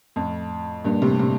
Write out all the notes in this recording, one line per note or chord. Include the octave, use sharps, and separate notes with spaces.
F2 A2
G2 A#2
A2 C3
A2 C3